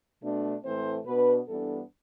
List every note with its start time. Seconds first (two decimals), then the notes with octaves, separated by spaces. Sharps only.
0.22 B2 A3 D4
0.64 A2 E3 A3 C4 C5
1.06 B2 B3 D4 B4
1.48 G2 E3 B3 D4 A4